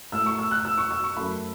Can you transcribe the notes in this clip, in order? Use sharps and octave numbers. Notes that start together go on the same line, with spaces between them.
A2 A3 E6
C#6
E6
F#6
E6
C#6
E6
C#6
F#2 F#3 A3 B5